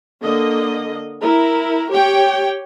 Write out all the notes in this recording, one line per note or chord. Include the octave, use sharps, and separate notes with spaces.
D3 A#3 D#5
E4 A#4
G4 C#5 G5